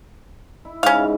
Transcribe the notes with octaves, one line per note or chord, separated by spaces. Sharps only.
E4
G#2 C#3 C#4 F5